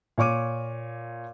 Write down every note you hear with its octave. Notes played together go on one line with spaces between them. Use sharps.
A#2 C#5 C#6 D6 D#7